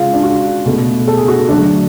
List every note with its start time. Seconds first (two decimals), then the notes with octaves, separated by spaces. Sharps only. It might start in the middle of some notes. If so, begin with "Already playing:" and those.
Already playing: C#3 G#3 F4
0.13 D4
0.24 F#4
0.66 B2 A3
1.07 A4
1.17 G#4
1.28 F#4
1.48 D3 F#3 A3 D4